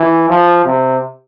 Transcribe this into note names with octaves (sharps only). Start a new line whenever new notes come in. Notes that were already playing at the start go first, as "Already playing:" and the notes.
Already playing: E3
F3
C3